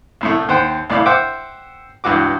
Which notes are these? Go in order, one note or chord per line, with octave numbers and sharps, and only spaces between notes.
C2 A2 A3
D#2 C5 F#5 G5
C2 A2 D5 F5 B5
C5 E5 F#5 G5 D6
C#2 G2 E3 F#4 D6